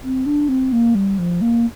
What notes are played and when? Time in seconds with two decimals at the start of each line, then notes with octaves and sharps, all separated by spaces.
0.03 C4
0.26 D4
0.49 C4
0.72 A#3
0.95 G3
1.18 F3
1.41 A#3